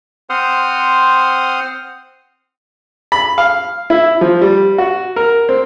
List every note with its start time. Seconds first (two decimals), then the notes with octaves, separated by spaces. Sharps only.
0.30 C4 C5 F#5 C6 D#6 F6
3.12 B5
3.38 F5
3.90 E4
4.21 F3
4.41 G3
4.78 F#4
5.16 A#4
5.49 C4